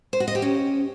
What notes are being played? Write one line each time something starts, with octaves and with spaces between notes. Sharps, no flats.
C5
F#4
D#5
G4
C#4